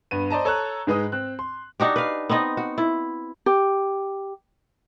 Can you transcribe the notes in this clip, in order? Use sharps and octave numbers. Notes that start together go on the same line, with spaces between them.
G2 B3 D#7
C5 D5 D#5 A5 A#5
A4 C#5 A5 A#5 F#6
G#2 G#3 B4 D#5 D#6
C4 F#6
C6
D4 D#4 F#4 G4
B4 F5
B3 C4 D#4 D#5
F#4
E4
G4